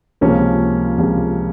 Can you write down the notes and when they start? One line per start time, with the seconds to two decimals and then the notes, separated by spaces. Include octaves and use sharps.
0.21 C#2 C3 F3 A#3 C#4
0.98 C#2 C3 F3